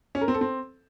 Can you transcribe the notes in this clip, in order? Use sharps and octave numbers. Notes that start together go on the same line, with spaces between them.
C#4
A#4
C4
A4
C4